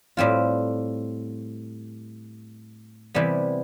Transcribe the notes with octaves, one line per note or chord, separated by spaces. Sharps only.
A2 G3 C4 F4
C3 E3 G3 B3